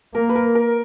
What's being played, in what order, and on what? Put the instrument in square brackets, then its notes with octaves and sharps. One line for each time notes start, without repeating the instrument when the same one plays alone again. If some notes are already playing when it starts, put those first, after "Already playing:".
[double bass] A#3 [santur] A#4
[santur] B4
A#4
A#4